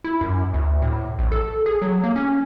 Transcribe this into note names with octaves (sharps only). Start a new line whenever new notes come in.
E4
F#2
D2
A2
A#1
A4
G#4
F#3
A#3
C#4